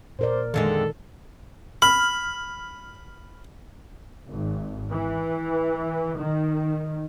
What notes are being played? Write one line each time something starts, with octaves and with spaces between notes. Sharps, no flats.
A#2 A#4 C5 D5
F2 D3 D#3 G#3 A4
B5 F6
G#1
E3
D#3